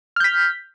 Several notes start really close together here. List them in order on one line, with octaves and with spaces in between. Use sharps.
F6 G6 B6